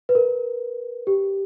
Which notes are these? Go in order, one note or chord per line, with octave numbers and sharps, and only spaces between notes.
B4
A#4
G4